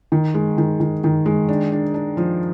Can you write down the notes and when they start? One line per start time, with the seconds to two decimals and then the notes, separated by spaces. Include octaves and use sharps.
0.12 D#3
0.34 G#3
0.58 D#3
0.80 D#3
1.04 D#3
1.26 G#3
1.48 D4
1.72 D4
1.94 D4
2.17 F3